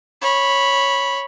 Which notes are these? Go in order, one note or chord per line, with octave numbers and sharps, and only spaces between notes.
C#5 B5